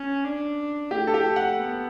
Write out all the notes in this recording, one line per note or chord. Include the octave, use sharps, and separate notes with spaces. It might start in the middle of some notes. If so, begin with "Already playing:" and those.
Already playing: C#4
D4
A3 G4
A4
G4
F#5
B3